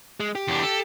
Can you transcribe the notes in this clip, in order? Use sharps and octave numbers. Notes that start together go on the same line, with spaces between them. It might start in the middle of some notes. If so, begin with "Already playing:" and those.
G#3
G4
E2 D4
A4